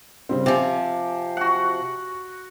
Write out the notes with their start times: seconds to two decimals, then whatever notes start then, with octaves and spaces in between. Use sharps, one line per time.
0.29 C#3 G3 C4
0.46 C3 F3 G#5 D6
1.37 F#4 F#5